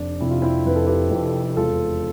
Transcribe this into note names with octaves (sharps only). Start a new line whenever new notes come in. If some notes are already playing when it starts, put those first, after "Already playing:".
Already playing: F1 D4
F2 C3 E4
F4
C4 E4
F1 B4
A4
G4 B4
F2 C3
E1 F4 A4